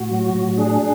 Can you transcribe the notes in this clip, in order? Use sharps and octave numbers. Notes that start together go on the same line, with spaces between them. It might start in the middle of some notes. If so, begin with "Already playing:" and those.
Already playing: A2 F#4
F#3
A2
D4 G#4